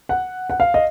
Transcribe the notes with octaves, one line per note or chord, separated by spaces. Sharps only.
F#5
F#5
F5
D#5